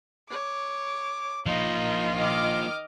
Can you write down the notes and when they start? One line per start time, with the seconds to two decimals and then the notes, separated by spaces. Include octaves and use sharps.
0.30 C#5 D6
1.46 F3 A#3 D#4 F4
2.16 D#3 D#5 D6 F6